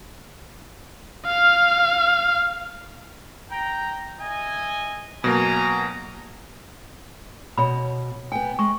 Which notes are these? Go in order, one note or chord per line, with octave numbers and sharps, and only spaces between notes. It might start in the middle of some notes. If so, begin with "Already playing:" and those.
F5 F6
G5 A#5
D#5 E5 G#5
B2 F#3 A#3 G#5 A#5
B2 C#5 B5
B3 G5 G#5
G#3 C#6